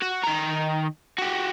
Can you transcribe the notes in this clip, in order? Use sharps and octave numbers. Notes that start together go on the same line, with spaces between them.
F#4
D#3 A#5
F#4 G4